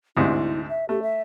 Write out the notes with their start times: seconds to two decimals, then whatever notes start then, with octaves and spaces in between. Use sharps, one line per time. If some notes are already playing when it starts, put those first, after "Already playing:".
0.17 D2 G#2 C3 E4
0.69 E5
0.89 A3 G4
1.02 E5